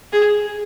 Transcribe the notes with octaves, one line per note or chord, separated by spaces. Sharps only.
G#4